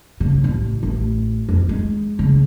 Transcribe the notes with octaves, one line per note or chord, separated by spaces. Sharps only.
C#3
A1
A1
F2
G#3
C#3